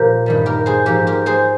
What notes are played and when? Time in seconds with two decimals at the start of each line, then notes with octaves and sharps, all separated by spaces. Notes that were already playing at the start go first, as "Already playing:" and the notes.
Already playing: A#2 F3 G4 A#4
0.26 G2 D#3 G3
0.46 G4 A#4
0.66 G#4 C5
0.86 G#2 F3 G4 A#4
1.07 G4 A#4
1.26 G#4 C5